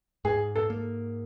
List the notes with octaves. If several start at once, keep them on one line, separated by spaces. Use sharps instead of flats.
G#2 G#4
A4
A#3